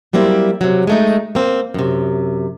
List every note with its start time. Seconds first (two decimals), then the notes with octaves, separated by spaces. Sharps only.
0.13 F#3 G3 A#3 C4 E4
0.61 C3 F#3
0.87 G#3 A3 D#4
1.35 A#3 C4
1.74 F#2 C3